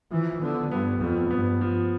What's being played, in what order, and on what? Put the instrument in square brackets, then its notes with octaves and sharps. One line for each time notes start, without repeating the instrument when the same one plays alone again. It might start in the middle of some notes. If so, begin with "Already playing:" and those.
[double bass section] E3 [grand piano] F3
[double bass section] D3 [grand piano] B3
[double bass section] G2 [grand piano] B3
[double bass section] F2 [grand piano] F3
[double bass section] G2 [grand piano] B3
[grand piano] F3